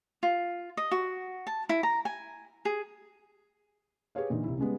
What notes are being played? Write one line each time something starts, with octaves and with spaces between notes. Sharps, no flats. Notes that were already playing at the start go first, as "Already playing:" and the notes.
F4
D#5
F#4
A5
E4
A#5
G#5
G#4
G4 G#4 B4 C#5 F5
A#2 D3 E3 D#4
C2 E4
C#3 G3 G#3 B3